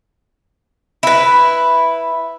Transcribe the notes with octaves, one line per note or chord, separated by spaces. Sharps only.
E4 B4